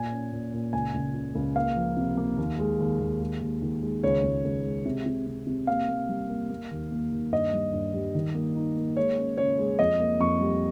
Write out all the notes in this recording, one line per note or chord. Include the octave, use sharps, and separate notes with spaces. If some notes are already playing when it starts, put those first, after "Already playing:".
Already playing: A#2 G#5
C#4
A#2
A#2
C#2 G#5
C#2
C#3
C#2
A#3 F5
F3
C3
A#3
D#2
G#3
D#2
D#2
G#3
D#2
D#3
G#3
C#2 C#5
C#2
C#2
G#3
C3
C3
C3
C3
A#3 F5
A#3
G3
A#3
A#3
D#2
A#3
D#2
G2 D#5
G3
G2
G3
D#3
A#3
D#4
A#3
G#3 C#5
C#4
C#3 C#5
G#3
F2 D#5
A#3
F2 C#6
G3